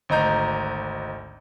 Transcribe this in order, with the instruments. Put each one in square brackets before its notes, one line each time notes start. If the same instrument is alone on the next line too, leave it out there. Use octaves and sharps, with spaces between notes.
[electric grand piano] G#1 D2 D#5 A#5 G6